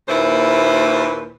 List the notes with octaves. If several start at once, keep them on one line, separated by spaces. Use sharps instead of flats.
D#2 A#2 E4 B4 C5